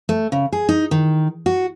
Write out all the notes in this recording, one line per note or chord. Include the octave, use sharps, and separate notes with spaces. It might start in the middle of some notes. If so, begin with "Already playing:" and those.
A3
C#3
G#4
D#4
D#3
F#4